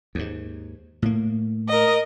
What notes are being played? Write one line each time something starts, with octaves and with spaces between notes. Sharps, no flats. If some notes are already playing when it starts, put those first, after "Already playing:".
D#2 G#2
A2 A#3
A#4 D#5